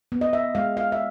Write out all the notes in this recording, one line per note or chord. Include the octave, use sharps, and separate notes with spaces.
B3
D#5
E5
G#3 F5
F5
E5